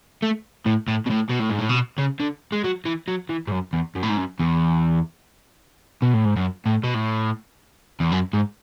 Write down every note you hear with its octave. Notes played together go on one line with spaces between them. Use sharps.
A3
A2
A2
B2
A2
B2
A2
G#2
A2
B2
C#3
D3
G#3
F#3
E3
F#3
E3
G#2
F#2
E2
F#2
A2
G#2
F#2
E2
B2
A2
G#2
F#2
A2
B2
A2
E2
F#2
G#2